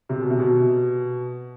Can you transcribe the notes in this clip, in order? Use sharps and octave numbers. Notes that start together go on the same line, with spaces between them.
C3
B2
C3
B2